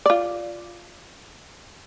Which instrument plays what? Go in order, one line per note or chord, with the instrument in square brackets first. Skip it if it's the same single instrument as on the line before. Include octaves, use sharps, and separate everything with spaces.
[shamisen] F4 D5